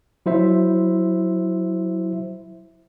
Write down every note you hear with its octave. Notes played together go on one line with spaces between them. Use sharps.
F#3 E4 C5 E5